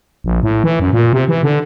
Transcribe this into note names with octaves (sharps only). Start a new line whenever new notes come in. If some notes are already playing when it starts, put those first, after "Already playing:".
A#1
A2
E3
F#2
A#2
C3
E3
D3